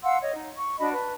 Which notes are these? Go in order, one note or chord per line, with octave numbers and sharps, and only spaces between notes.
F5 F#5 C6 E6
C#5 D#5
D#4
C#6
D4 F#4 D#5 B5
B4 A5